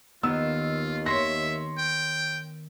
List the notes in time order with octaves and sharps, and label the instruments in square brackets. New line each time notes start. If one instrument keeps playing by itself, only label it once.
[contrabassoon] D#2 [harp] D#3 B3 [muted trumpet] F4 [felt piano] E6
[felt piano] C#5 C6 A#6 [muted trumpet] E5
[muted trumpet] G5